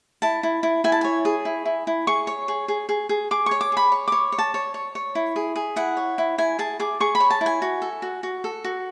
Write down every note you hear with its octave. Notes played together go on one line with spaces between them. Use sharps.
E4 A5
E4
E4
E4 G#5
A5
C#5 G#5
G#4
E4
E4
E4
G#4 C#6
C#5
G#4
G#4
G#4
G#4
G#4 D6
C#5 C#6
D6
G#4 B5
C#5
C#5 D6
C#5
A5
C#5
C#5
C#5
E4
G#4
G#4
E4 F#5
C#5
E4
E4 G#5
G#4 A5
G#4 D6
G#4 C#6
B5
C#5
A5
E4
G#5
F#4
A4
F#4
F#4
A4
F#4